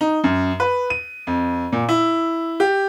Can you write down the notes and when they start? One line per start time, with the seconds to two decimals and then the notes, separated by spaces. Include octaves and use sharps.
0.01 D#4
0.24 F#2
0.60 B4
0.90 D#7
1.27 F2
1.72 A#2
1.89 E4
2.60 G4